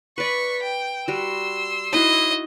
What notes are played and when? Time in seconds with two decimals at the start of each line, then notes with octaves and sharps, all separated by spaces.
0.18 B4 D5 C#6 B6
0.63 G5
1.08 G3 F#4 C6 E6
1.93 D#4 E4 F#4 D#5